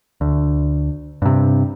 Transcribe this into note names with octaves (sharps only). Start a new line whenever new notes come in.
D2
G2 C3